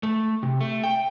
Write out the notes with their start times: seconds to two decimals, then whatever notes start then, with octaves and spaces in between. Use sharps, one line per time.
0.03 A3
0.43 C3
0.61 A3
0.84 G5